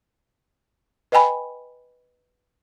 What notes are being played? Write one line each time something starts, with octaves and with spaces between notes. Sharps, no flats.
B4 D#5 G5 G#5 B5